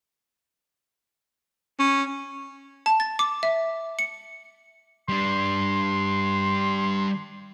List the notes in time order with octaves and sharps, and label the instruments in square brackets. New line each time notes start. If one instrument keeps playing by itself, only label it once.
[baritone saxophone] C#4
[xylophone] A5
A6
D6
E5
C#7
[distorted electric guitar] G3 D4 [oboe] C6